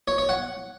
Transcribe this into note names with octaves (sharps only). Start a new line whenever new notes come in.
C#5
C#5
F#5